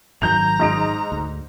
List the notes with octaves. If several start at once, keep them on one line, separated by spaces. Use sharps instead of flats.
G#1 D#3 F#3 A#5 G6 F7
G#2 D#5 D7
D2